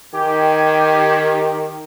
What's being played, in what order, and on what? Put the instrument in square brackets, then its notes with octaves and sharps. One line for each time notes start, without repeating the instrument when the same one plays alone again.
[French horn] D#3 [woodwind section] G4 [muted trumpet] G#5